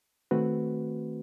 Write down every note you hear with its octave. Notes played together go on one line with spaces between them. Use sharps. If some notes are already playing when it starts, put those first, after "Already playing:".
D#3 A3 C4 F#4 B4